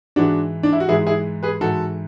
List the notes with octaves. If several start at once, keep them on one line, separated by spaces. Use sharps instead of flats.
G#2 E3 G#3 D4 F#4
D4
E4
F#4
G#2 E3 G#3 E4 G#4
E4 G#4
G#4 B4
G#2 E3 G#3 F#4 A4